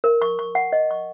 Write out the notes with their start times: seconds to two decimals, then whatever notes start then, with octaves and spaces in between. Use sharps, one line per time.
0.04 A#4
0.22 C#6
0.39 C#6
0.55 F#5
0.73 D#5
0.91 C#6